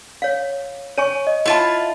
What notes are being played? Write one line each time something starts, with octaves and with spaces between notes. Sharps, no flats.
C#5 F5
C#5 G#5 C#6 D#7
D#5
E4 F4 A5